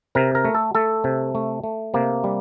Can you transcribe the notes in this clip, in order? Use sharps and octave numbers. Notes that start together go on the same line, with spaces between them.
C3 A#4
A#4
A3
A4
A3 A4
C3
A3
A3
C3 A#3
G3